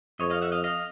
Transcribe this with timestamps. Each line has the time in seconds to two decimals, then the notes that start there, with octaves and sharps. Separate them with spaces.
0.20 F2 C#5 D#5
0.30 D#5 F5
0.42 E5 F#5
0.52 D#5 F5
0.64 D#5 F5